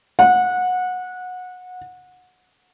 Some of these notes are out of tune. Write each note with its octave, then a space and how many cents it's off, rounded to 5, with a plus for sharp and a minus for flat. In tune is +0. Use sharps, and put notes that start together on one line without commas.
F#5 -20